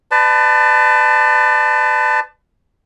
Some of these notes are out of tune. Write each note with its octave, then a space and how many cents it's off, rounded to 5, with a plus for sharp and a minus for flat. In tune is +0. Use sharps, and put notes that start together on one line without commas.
B4 +30 D5 +35 A5 +0